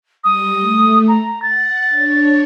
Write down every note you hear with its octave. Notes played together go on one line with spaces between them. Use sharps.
G3 D#6
A3
A#5
F#5 A6
D4 C#5